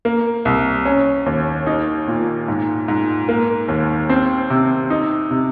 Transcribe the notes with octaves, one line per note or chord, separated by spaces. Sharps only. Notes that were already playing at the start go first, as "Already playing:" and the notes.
A#3
C2
C#4
D#2
D#4
A#2
G#2
G#2
A#3
D#2
C4
C3
D#4
C3